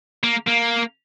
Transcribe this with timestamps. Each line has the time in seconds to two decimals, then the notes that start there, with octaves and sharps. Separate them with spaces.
0.24 A#3
0.48 A#3